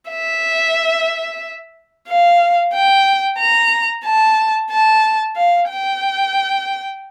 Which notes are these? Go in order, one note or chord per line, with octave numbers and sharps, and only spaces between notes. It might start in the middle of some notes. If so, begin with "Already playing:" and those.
E5
F5
G5
A#5
A5
A5
F5
G5